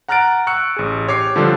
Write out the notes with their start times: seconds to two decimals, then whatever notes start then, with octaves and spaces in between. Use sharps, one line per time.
0.08 F#5 A#5 F6 F#6 A6 D7
0.47 C#6 E6 F#6 C#7
0.77 A1 G#4
1.08 G4 C#5 D6 C7
1.35 D3 F3 G3 D4 F4 A4